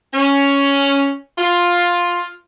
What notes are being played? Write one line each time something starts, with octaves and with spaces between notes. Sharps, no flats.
C#4
F4